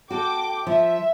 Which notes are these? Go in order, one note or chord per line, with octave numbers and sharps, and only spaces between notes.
F#4 A4 G5 D6
F3 E5